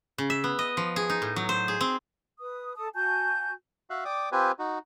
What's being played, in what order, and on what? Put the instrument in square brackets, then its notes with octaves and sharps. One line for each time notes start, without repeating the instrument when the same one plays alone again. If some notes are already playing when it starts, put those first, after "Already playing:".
[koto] C#3
E5
B3
D#5
F3
G#4
D#4
A2
F#3
C5
G#4
C4
[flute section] B4 D#6
A4 A5 D#6
F#4 G#5 A5 G6
[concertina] F#4 E5 F5 F#6
D5 G5 D6 D#6
C4 F4 G4 B4 C5 G#5
D#4 F#4